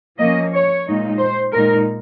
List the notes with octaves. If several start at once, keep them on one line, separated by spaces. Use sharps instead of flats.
F3 A#3 C#4 D#5
C#5
A#2 G#3 D#4
C5
A#2 G#3 D#4 A#4